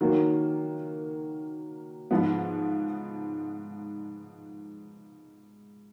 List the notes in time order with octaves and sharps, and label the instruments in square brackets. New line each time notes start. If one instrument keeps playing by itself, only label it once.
[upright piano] D#3 F#3 A#3
G#2 F3 G#3 B3